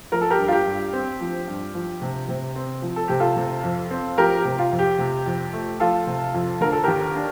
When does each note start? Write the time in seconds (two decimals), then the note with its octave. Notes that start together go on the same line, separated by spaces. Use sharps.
0.12 F3 A#4
0.21 A4
0.30 G4 A#4
0.38 G2
0.48 F4
0.52 G4
0.66 G2
0.93 C4
1.21 F3
1.48 G2
1.74 F3
2.02 C3
2.29 C3
2.55 C4
2.82 F3
2.96 A4
3.08 C3 G4
3.20 F4 A4
3.36 C3
3.63 F2
3.91 C4
4.18 F3 G4 A#4
4.38 G4
4.45 C3
4.58 F4
4.71 F2
4.79 G4
4.99 C3
5.26 F2
5.53 A3
5.80 F3 F4 A4
6.07 C3
6.34 F2
6.61 D3 A#4
6.72 A4
6.83 D#2 G4 A#4
7.15 D4